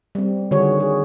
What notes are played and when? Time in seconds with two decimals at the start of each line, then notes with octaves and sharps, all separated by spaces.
0.15 G3 C4
0.51 D3 D#3 G3 F#4 G#4 C#5
0.80 G#4